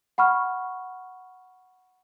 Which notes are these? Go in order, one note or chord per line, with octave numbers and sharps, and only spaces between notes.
F#5 B5 C#6 F6